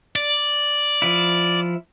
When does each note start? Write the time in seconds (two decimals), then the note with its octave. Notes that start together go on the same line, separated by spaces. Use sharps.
0.16 D5
1.02 F3 E4